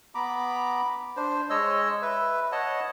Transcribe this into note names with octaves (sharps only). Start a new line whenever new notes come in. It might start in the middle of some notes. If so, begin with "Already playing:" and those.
B3 A#5 B5 D6
D4 C5
G#3 C#5 D#5 E6
B4 E5
C#5 D#5 F#5 A5